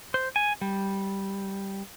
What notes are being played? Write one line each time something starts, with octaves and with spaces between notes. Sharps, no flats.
C5
G#5
G3